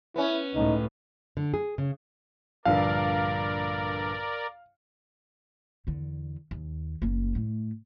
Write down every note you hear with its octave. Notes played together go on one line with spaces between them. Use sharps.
B3 C#4 E4
C#2 A2 D#4
D3
G#4
C#3
A#1 G2 D3 A#4 D5 F5
E2 D3
D#2
F#1 A#3
A2 A3